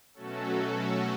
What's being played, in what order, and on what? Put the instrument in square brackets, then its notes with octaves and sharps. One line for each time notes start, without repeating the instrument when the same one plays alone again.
[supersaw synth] B2 F#3 A3 C#4 F#4 A4